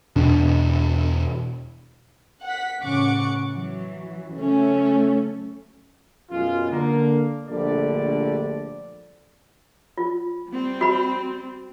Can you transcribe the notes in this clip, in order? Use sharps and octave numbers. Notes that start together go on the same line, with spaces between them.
E2 B2 D4
F#5 B6
A1 C#3 F#5 C#6 D6 C#7
E3 F#3
C#3 F#3 A3 C#4
F#2 B2 G#3 F4
D3 A#3
A#1 D3 G3 A3 D5
F4
G3 C4
F#4 B5